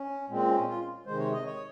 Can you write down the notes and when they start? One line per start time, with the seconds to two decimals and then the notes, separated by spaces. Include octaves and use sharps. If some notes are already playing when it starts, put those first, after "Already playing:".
Already playing: C#4
0.29 A#2 G#3 C4
0.48 C#4
0.68 F4
1.06 C3 D#3 G#3 C5
1.19 C#5
1.32 D#5
1.45 C#5